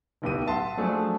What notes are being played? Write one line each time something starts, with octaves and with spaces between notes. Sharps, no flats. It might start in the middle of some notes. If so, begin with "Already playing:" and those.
D1 B1 B3 G4 D#7
E5 F#5 A5 C6
F3 F#3 A3 D4 G#4